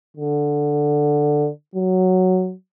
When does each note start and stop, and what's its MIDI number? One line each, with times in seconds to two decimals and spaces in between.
0.17 1.49 50
1.75 2.54 54